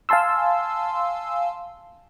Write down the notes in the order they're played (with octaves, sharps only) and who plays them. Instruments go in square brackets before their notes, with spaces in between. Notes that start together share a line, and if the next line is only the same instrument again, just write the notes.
[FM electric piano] F5 G#5 A5 C6 E6